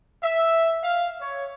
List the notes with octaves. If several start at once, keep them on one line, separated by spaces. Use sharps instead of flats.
E5
F5
C#5